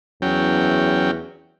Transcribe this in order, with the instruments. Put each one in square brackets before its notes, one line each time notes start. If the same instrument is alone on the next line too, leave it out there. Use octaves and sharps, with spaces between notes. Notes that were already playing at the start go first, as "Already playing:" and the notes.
[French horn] E2 [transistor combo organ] F#3 C#4 G5